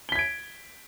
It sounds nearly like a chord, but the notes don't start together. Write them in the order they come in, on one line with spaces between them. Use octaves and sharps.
G7 B6 G#6 D7